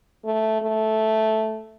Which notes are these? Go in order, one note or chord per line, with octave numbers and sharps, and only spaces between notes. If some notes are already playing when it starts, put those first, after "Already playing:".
A3
A3